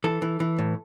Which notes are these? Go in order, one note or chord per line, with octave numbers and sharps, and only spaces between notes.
E3 A4
E3
E3
A2